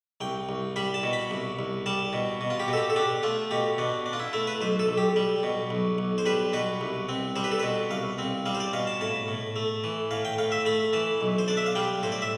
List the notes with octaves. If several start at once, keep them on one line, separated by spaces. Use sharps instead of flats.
C2 G5
C2
G3 B5
A5
B2
B5
C2
C2
G3 A5
B2
B2
F4
G4
B2 A4
G4
A4
D4 G4
A3 F4
B2 G4
B2 D4
D4
F4
E4
A3 E4
B4
B1 C5
A4
B1
G4
G3
B2
B1
B1
C5
G3 B4
B2 B4
C2
C4
G3 C5
B4
A4
B2 B4
C2 F5
C4
G3 F5
C5
D5
B2 F5
A5
A2 A5
A2
A3
E3
A2 F5
G5
A2 F5
E5
A3 B5
E3 A5
B1
C5
D4 D5
E5
F5
G3 G5
A2 C5
D5
E5